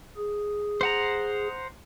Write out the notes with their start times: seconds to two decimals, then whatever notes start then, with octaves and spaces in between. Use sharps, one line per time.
0.17 G#4
0.81 C5 F#5 A#5